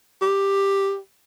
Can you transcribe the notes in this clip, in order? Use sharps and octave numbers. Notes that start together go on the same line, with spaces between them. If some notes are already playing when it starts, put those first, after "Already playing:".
G4